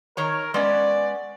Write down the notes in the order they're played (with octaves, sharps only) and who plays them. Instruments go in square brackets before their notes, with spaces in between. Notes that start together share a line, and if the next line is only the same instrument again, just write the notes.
[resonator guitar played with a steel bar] D#3 C#5 A#5 [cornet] A#4
[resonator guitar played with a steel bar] G#3 B3 C#4 [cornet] D5